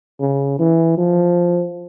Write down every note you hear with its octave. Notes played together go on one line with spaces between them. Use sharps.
C#3
E3
F3